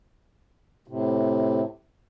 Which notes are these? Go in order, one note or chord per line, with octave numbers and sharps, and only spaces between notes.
A2 C3